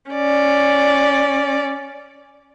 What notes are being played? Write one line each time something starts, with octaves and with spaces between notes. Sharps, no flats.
C#4 D5